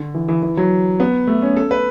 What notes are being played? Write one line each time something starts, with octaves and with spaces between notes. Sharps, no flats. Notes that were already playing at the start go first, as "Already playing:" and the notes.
Already playing: D3
E3
E3
E3
F#3
B3
A3
C#4
A4
B4